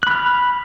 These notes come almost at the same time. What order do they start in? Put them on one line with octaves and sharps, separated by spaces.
F#6 B5 F6